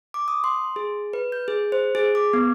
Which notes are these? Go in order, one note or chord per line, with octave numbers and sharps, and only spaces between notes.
D6
D#6
C6
G#4
B4
G6
G#4
C5
G#4
D6
B3